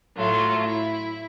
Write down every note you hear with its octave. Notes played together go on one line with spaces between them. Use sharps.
A2 F#3 A3 F4
E4